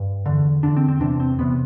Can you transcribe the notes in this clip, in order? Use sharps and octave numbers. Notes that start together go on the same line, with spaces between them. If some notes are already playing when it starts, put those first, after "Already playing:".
Already playing: G2
E2 D3
E2 D3 D4
C4
C4
E2 C3 D4
C4
E2 C3 B3